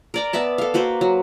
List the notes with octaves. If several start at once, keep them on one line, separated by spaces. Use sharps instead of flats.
A#4 D5 A#5
B3 D5 E5 A5
A4 F5
A#3 F#4 B4 C5
F#3